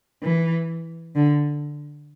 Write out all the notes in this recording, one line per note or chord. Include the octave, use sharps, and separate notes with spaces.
E3
D3